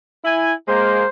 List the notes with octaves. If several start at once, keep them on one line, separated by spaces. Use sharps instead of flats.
E4 G#5
G#3 A#3 C5